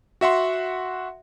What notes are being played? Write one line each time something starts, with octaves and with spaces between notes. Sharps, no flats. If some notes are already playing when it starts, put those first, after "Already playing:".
F#4 E5 F#5 C6